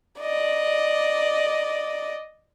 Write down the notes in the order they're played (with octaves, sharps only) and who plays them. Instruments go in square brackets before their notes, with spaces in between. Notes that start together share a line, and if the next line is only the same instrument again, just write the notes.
[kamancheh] D5 D#5